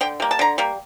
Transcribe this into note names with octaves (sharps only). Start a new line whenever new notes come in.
D3 G5
G3 A#3
A5
D3 A#5
G3 A#3